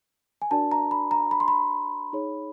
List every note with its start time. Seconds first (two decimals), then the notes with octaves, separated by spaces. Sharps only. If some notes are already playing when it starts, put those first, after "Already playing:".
0.42 G#5
0.51 D4 F#4 A#4 D5 A5
0.72 A#5
0.91 B5
1.11 A#5
1.31 B5
1.40 C6
1.48 B5
2.13 D#4 G#4 C#5